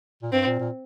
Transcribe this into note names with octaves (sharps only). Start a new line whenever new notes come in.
A#2
G2 C4
A#2
A#2